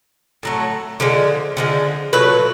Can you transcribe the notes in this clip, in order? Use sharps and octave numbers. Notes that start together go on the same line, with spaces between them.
A2 F#3 A3
D3 F3 G#3
D3 F3 G#3
A#2 F#3 A3 B4